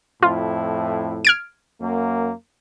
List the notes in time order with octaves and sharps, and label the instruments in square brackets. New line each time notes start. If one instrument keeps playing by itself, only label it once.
[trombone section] F2 A2 E4 [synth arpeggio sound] F4
[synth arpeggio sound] F6 G#6 D7
[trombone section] F#2 A#3